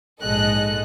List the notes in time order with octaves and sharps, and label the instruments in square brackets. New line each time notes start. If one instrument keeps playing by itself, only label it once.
[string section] A#1 G#2 G#3 A4 D#5 F#6